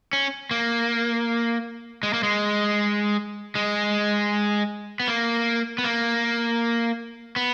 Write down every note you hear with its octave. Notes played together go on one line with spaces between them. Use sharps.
C#4
A#3
G#3
A#3
G#3
G#3
B3
A#3
B3
A#3
B3